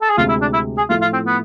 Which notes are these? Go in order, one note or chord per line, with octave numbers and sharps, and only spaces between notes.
A4
G#4
D2 C3 G#3 F4
E4
D4
E4
G#4
A2 F3 A3 E4 F4
F4
C4
B3